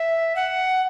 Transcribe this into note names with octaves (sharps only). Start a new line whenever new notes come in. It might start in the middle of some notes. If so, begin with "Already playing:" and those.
Already playing: E5
F#5